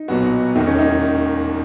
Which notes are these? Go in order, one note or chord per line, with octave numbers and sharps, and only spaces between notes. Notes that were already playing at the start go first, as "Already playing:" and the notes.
Already playing: D#4
B1 A#2 F#3 B3 F#4
E1 D#2 D#3 A#3 D#4
C#4
D#4